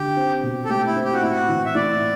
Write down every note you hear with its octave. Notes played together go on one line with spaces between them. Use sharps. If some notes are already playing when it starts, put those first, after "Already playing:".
Already playing: D3 G4
C4
B2
A4
A3 G4
E4
C4
G4
F#4
A2 E4
F#4
E3
E5
A2 D5